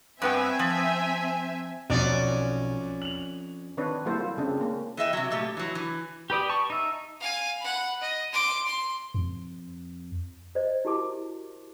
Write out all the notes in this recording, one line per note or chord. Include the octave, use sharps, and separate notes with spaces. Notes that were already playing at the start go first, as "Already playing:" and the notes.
G2 B3 C4 E5 G5 G#5
F3
B1 F2 C#4 D5
F7 F#7
D#3 C4 D4 B4 C#5
F#3 G3 A#3 E4 A4 C5
F4
C#3 C4 D4
A#3 C#4
E3 D#5 E5 G5
C3 F#3
A#2 A3 G4
E3 F#3
E3
G4 B4 D5 D#6
A5 C#6
D#4 E5
F5 G#5
F#5 B5
D#5
C6 D6
C6
F2
C5 D5 D#5
E4 F#4 G4 A#4 A5 D6